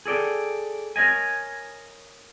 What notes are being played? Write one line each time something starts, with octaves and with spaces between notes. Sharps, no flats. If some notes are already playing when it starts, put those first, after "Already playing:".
G#4 A4 D5 G5
A#4 C#5 D#5 G#5